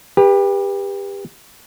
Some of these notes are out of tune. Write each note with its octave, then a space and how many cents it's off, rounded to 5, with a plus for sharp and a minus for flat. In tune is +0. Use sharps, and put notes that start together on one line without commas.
G4 +25 B4 -20